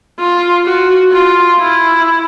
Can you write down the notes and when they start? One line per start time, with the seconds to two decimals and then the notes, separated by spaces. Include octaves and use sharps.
0.19 F4
0.65 F#4
1.12 F4
1.59 E4